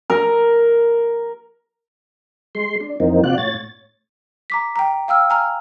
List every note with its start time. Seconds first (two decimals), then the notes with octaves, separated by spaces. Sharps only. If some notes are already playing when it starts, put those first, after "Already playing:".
0.10 A#4
2.55 G#3 C6
2.81 D4
3.00 F2 E3 A#3 C4 D#4
3.24 C3 F4 F#4 D5 F#6
3.38 A2 C#5 A6
4.50 A#5 D6 B6
4.76 G5 A#5
5.08 F5 G5 E6 F6
5.30 G#5 A#5 F6